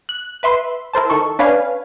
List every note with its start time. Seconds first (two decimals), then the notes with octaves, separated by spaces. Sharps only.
0.09 F#6
0.43 B4 E5 C6
0.93 E4 A#4 C5 A5
1.10 D#3 A4 C#6
1.39 C#4 D4 B4 C#5 F5 G#5